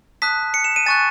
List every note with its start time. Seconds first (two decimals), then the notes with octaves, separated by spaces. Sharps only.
0.22 A5 D#6 F#6 B6
0.54 C#7
0.64 E7
0.76 D#7
0.86 G#5 C#6 F#6 A6